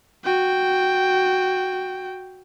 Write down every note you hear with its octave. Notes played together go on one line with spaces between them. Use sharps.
F#4 G5